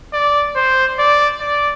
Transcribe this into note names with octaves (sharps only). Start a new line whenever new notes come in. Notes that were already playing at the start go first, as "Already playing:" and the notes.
D5
C5
D5
D5